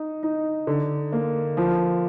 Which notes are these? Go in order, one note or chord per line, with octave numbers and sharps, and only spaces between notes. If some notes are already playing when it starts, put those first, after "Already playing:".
Already playing: D#4
D#4
D3
A#3
F3